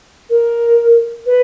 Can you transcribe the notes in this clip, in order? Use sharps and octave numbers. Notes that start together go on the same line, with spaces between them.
A#4
B4